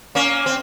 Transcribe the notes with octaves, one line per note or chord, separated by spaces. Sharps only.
A#3 C#4
C4